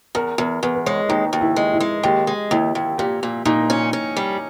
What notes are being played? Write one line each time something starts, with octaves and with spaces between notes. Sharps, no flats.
E2 A#4
E2 A#4
E2 B4
B4
G#3 C#5
D#2 D#4
D#2
E4
G#3
E4
G#3
D#2 G4
G#3
D#2 E4
D#2
A#2 G4
A#2
A#2 D#4
C#4
C#4
G3